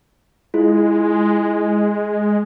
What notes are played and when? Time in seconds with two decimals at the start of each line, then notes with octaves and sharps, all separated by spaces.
0.54 G#3 E4 F4